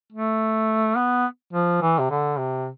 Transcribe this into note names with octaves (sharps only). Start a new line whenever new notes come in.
A3
B3
F3
E3
C3
D3
C3